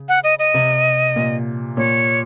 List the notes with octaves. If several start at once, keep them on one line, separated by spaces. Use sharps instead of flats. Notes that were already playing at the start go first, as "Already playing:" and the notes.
Already playing: C#3
F#5
D#5
D#5
C3
A#2
A#2 C#5